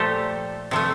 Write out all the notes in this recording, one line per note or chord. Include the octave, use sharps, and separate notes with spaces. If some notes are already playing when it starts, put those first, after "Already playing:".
Already playing: A#2 F3 A3 G4 A4
C3 F3 A3